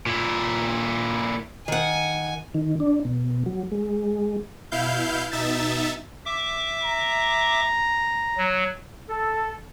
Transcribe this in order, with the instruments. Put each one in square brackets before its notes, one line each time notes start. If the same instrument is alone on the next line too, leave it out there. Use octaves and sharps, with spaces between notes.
[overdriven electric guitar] A#2 E4
[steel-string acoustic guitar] D#3 F#5 [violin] G#5
[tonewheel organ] D#3
D4
B2
F#3
G#3
[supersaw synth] B2 E4 F5 G6
B2 D#4 E5 A6
[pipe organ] E5 D6
[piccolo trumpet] A#5
[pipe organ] F#3
[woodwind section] A4